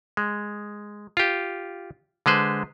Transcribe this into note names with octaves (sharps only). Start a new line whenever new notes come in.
G#3
F4 G4
D3 G#3 B4 C5